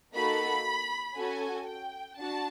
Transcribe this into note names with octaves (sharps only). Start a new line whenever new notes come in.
A#3 D#4 F#4 A4 B5
C#4 F#4 A4 G#5
G5
D4 F#4 A5